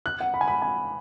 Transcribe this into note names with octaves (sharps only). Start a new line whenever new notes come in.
F#6
F#5
B5
G#5
B5
G#5